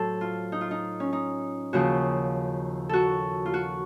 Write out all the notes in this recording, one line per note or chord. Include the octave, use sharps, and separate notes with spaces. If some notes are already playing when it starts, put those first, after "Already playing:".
Already playing: A2 F#3 A4 C5
F4
D#4
F4
D#4
C#4
D#4
D#2 C#3 F3 F#4
F#4 A4
F4
F#4